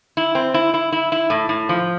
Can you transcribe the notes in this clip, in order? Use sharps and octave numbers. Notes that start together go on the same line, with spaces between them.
E4
C4
E4
E4
E4
E4
A2
A2
F3